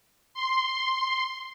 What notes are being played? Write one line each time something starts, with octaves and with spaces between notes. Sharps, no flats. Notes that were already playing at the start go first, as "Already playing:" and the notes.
C6